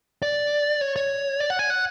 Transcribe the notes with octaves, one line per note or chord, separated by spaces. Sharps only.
D5
C#5
C#5
D5
F#5
G#5
F#5